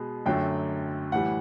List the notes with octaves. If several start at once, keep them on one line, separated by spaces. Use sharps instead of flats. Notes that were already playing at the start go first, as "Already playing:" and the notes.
Already playing: B2 G#3
F#2 D3 F#3 A3 G5
A2 E3 G3 F#5